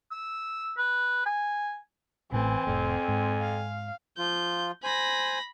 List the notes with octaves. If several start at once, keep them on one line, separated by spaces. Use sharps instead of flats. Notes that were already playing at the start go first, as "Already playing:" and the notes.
E6
B4
G#5
A1 A2 E3 A3 C4 G#5
F1 F2 A2
G#2
F5
F3 F4 G6
C5 G#5 B5 A#6